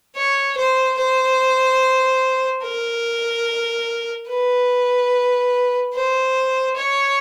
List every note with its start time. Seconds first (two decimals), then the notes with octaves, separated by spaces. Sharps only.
0.16 C#5
0.57 C5
0.98 C5
2.63 A#4
4.29 B4
5.94 C5
6.76 C#5